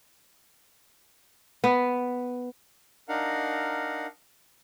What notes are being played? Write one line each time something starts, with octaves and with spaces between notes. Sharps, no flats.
B3
D4 D#4 A#4 F5 F#5